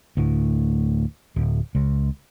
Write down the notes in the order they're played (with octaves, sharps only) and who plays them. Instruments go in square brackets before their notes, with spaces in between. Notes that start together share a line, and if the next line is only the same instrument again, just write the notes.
[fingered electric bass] D2 A2
D1
C#2